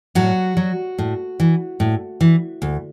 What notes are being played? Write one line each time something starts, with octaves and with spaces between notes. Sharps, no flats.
A2 F#3 F#4
F#3
A2
E3
A2
E3
D2